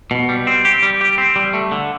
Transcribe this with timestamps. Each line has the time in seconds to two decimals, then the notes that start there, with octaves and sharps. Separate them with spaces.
0.11 B2
0.29 G3
0.47 C4
0.65 G4
0.83 G3
1.01 G4
1.18 C4
1.36 G3
1.53 A3
1.72 D3